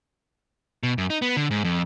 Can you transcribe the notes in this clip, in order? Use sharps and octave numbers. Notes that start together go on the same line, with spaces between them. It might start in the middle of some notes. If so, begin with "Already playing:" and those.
B2
F#2
D#4
B3
D3
G#2
F2